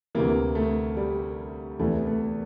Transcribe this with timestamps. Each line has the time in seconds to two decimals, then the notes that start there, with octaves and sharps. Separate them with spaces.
0.15 D2 C3 E3 A#3
0.55 A3
0.97 G3
1.79 E2 C3 E3 A3
2.07 A3